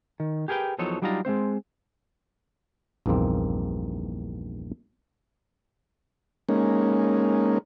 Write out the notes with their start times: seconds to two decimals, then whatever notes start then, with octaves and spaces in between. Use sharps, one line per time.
0.20 D#3
0.48 G4 G#4 A#4 B4 G5
0.79 E2 F3 F#3 D#4 A4 C#5
1.02 F#3 G3 D4 D#4 F4 A#5
1.25 G#3 A#3 C4 C5
3.06 A#1 E2 G2 D#3 A#3 C4
6.49 G#3 A#3 C#4 D#4